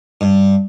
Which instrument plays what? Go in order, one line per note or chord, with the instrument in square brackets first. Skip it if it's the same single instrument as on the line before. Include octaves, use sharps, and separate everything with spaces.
[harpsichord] G2